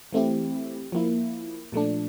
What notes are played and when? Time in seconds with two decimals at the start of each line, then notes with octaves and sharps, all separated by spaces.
0.13 E3 A3 C4 E4 G4
0.92 F3 A#3 E4
1.72 A#2 F3 A3 D4